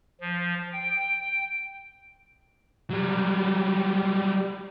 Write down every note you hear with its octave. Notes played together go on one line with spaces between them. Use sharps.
F3
G5
F#3 G3